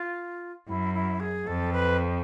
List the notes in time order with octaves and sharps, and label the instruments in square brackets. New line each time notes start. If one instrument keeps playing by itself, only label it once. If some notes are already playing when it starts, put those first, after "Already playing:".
Already playing: [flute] F4
[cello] F#2 [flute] E4
[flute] E4
G#4
[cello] F2 [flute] A4
[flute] B4